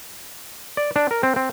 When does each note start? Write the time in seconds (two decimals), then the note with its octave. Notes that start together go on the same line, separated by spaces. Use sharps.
0.77 D5
0.96 D4
1.11 A#4
1.23 C4
1.36 C4